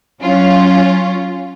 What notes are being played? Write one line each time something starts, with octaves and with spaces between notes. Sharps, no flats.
F#3 C#4 F4